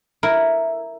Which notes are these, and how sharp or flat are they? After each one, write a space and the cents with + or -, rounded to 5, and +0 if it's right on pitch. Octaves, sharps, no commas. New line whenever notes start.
E4 +0 A#4 +0